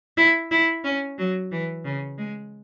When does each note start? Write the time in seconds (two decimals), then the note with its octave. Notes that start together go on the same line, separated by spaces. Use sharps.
0.17 E4
0.51 E4
0.84 C#4
1.18 F#3
1.52 E3
1.85 C#3
2.18 G#3